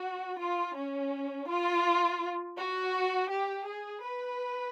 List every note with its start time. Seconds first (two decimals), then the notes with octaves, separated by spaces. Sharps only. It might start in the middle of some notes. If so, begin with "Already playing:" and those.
Already playing: F#4
0.38 F4
0.75 C#4
1.48 F4
2.57 F#4
3.31 G4
3.67 G#4
4.03 B4